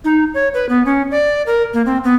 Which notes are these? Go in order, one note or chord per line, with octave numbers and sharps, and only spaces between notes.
D#4
C#5
B4
B3
C#4
D5
A#4
A#3
C4
B3